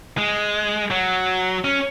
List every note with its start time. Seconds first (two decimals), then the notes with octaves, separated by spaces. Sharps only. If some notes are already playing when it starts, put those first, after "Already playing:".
0.18 G#3
0.91 F#3
1.64 C#4